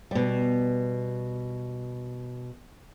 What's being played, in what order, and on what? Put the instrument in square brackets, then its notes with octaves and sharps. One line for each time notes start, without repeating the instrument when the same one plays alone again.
[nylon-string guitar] B2 G3